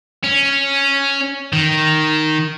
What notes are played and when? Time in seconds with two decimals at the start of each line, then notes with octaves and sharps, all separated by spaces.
0.24 C#4
1.53 D#3